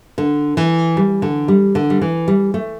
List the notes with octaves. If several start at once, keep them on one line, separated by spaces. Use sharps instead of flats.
D3
E3
G3
D3
G3
D3
G3
E3
G3
A3